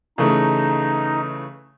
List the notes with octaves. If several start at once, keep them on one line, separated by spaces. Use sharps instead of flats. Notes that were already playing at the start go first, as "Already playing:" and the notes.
C#3 E3 A3 D#4